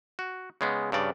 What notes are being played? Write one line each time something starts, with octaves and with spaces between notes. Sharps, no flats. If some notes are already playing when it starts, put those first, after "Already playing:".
F#4
C#3 G#3 B3
G2 C#3 D5